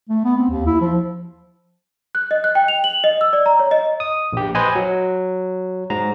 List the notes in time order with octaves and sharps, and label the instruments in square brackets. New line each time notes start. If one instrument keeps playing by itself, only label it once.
[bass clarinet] A3
B3
C4
D#2
E4
F3
[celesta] F#6
D#5
F#6
G5
F7
F#7
D#5
E6
D5
A#5
C#5
D#5
[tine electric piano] D#6
A#1 G4
B4 C5 D#5 G#5
F#3
G#2 A#5